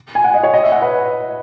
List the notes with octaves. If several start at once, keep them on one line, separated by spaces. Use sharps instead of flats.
G#5
F#5
D#5
C#5
D#5
E5
F#5
B4